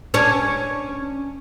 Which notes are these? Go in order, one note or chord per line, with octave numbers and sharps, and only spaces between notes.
C#4 D4 C#5